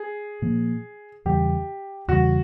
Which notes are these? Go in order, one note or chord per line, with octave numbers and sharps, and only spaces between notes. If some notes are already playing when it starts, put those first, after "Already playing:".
Already playing: G#4
A#2 F3 A#3
E2 C#3 E3 G3 G4
E2 C#3 E3 G3 F#4